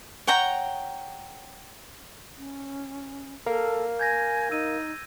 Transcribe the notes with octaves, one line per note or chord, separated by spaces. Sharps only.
C#5 F#5 G5 A#5
C#4
A4 A#4 F5
G#5 G6 G#6 A#6
D#4 E6 D#7